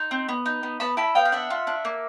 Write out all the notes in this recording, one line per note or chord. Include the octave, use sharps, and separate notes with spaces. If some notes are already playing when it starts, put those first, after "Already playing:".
Already playing: D#4 C6
C4
B3
D#4
B3
B3 A5 B5
E4 A5 B5
B3 F5 G5
F5
D4 E5 F#5
F4
D4
A#3